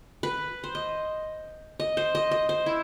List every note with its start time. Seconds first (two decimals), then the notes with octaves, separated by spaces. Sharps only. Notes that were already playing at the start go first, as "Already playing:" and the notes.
0.23 B4
0.64 C5
0.75 D#5
1.80 D#5
1.97 C5
2.15 D#5
2.31 D#5
2.49 C5
2.66 E4